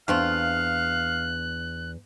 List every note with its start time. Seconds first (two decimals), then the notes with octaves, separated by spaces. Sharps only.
0.08 E2 A3 C4 D4 F4 F5 F#6